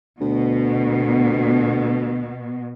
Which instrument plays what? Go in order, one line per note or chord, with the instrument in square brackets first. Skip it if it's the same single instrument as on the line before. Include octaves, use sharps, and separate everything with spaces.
[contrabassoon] D2 [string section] B2